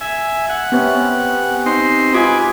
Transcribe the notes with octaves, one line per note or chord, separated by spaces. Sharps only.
E5 G#5
F#5
C3 B3 C#4
C4 D#4 C6
G#3 F4 B4 G#5 D6